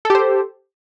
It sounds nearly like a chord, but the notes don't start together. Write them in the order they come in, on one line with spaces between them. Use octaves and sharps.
A4 G4 C5